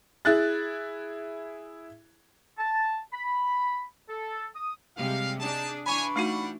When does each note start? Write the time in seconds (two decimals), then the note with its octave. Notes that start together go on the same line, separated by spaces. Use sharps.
0.25 E4 G#4 F#6 A6
2.58 A5
3.12 B5
4.09 A4
4.55 D#6
4.97 C3 G3 G#3 F5
5.40 D4 D#4 G#4 A5
5.86 E3 D4 C#5 G#5 B5 C#6
6.16 G3 A3 D#4 F#4 F#5